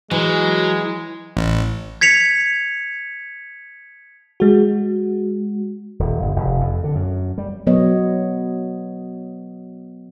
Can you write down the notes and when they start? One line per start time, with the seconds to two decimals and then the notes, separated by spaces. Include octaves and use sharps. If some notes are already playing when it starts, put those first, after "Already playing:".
0.11 E3 F#3 G#3
1.37 A1
2.01 G#6 B6 C#7 F7
4.40 G#3 F#4
5.99 D#1
6.22 G1
6.36 F1
6.61 F2
6.84 D3
6.95 F#2
7.38 G3
7.66 B2 F#3 B3 C#5 D#5